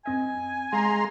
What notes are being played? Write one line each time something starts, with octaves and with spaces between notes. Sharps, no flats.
F#2 C4 D#5 G#5
G#3 F5 A#5 C6